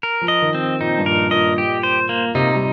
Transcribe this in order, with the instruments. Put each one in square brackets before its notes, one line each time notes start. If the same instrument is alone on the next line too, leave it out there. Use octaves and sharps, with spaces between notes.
[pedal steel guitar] A#4
[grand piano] F3
[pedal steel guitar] D#5
[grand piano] D#3
[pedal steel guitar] C4
[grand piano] A#2 [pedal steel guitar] D#4
[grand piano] G2
[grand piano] A#2 [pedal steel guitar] A#4
[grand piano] A#2 [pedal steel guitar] D#5
[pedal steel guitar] G4
C5
A#3
[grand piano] C3 [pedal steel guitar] D#4
[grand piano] G3